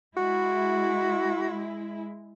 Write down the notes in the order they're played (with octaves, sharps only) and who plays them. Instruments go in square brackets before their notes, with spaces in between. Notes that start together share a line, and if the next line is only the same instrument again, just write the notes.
[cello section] G#3 E4 [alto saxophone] F#4